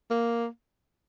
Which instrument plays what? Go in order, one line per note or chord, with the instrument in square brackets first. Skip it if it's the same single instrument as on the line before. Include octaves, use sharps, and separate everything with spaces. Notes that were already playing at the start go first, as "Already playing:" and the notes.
[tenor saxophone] A#3